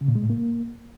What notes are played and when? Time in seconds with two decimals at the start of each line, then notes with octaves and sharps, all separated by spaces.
0.01 C#3
0.08 A#2
0.15 G#3
0.23 A2
0.30 A#3